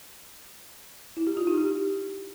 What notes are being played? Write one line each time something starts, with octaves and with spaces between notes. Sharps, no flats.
E4
G4
F4
D#4
G4